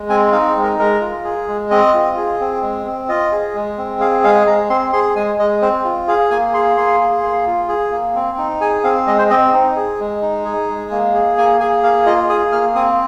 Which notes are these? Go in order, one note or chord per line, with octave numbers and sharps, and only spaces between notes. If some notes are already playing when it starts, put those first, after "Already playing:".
Already playing: G#3
C4 G#5
D#4 F5
G#3
A#4
G#3 A#4
F4
G#4
G#3
C4 D#5
F4
G#4
C4
G#3
C4
F4 D#5
G#4
G#3
C4
G#4 F5
G#3 F5
G#3 A#5
C4 C6
G#4 C6
G#3 G#5
G#3 D#5
C4 C5
F4
G#4 F5
A#3 G#5
G#4 C6
A#3 C6
G#4
A#3
F4
G#4
A#3
C4
D#4
G#4 G#5
C4 F5
G#3 D#5
C5
C4 D#5
D#4
G#4
G#3
D#4
G#4
G#3
A#3
G#4
A#3 G#5
G#4 G#5
A#3 F5
F4 D#5
G#4 D#6
A#3 F6
C4 D#6